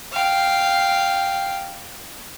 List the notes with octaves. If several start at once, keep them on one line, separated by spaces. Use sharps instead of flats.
F5 G5